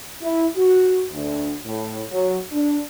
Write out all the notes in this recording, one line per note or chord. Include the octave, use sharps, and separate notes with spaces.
E4
F#4
D2
A2
F#3
D4